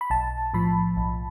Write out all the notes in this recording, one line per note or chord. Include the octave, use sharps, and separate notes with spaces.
B5
B1 A5
A2 F3 B5
B1